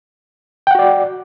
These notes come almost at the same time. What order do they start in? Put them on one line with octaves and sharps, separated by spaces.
G5 F#5 F#4 D5